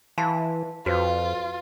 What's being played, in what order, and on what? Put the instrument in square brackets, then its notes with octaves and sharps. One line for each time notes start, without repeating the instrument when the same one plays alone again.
[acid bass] E3 [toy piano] F5 A5 C6
[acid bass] F2 [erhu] F4 [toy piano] F#4 B4 C5